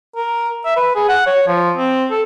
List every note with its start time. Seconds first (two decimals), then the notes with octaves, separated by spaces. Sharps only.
0.16 A#4
0.65 E5
0.77 B4
0.96 G#4
1.09 F#5
1.26 C#5
1.47 F3
1.77 C4
2.11 A4